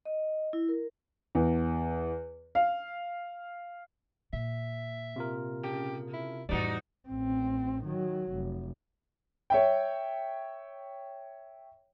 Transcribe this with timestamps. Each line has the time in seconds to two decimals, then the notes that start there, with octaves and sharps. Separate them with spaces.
0.05 D#5
0.53 E4
0.69 A#4
1.35 E2
2.55 F5
4.33 A#2 E5
5.16 C3 F4 A#4
5.63 C#3 G4
6.14 E4
6.49 F2 A2 E3 G3 D#4 F#4 D5
7.09 A1 C4
7.84 D#3 F#3
8.31 F1
9.50 C#5 E5 G5